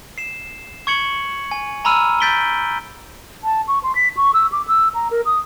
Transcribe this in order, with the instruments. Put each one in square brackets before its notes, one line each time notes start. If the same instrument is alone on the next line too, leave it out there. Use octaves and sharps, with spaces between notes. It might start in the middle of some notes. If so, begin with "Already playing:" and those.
[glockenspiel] C7 E7
C#6 G#6 C#7 F#7
G#5
G#5 A#5 B5 E6 F6 D#7
G6 A6 B6 D7 F#7 G7
[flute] A5
C#6
C6
B6
C#6
E6
D6
E6
A#5
A#4
D#6